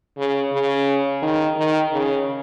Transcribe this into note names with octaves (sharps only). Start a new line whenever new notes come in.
C#3
C#3
D#3
D#3
C#3